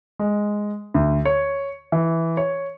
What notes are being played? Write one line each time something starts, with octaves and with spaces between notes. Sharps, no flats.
G#3
D2
C#5
E3
C#5